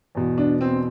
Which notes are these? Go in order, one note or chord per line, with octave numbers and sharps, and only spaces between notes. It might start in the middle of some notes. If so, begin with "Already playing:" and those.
E2 B2
D4
C4